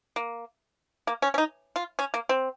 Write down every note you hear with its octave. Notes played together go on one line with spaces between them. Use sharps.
A#3
A#3
C#4
C#4
D#4
F4
C#4
A#3
C4